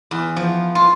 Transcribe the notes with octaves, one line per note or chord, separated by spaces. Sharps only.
E2
F3
F4